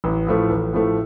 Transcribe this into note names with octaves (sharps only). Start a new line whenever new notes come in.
A1
A2 F3 A3
A1
A2 F3 A3